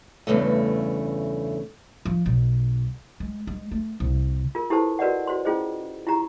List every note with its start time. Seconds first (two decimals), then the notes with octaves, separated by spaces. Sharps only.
0.27 E2 G2 C#3 A3
2.05 F3
2.26 B1
3.20 G#3
3.47 G#3
3.72 A3
4.00 C2
4.55 F4 A#4
4.70 E4 G4 A4 B4 C5 A5
4.99 F#4 A#4 B4 D5 D#5 F#5
5.27 F#4 C5 C6
5.45 C#4 E4 F4 G#4 C5 D#5
6.07 E4 F4 G4 A#5